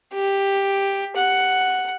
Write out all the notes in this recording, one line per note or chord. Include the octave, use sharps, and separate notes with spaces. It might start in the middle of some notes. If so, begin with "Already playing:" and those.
G4
F#5